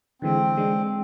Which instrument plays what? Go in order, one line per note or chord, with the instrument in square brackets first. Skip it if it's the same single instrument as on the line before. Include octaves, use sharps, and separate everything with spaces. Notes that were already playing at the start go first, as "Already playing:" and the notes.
[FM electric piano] D3 E3 G#3 [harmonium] C4
[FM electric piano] G#3 D4